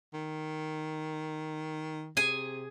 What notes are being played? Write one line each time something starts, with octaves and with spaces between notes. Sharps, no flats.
D#3
C3 G#4 G#5